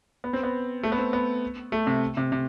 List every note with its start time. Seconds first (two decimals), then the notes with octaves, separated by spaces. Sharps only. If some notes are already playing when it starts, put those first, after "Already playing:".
0.24 B3
0.33 C4
0.43 B3
0.83 A3
0.92 B3
0.98 C4
1.13 B3
1.72 A3
1.87 C3
2.17 C3
2.32 C3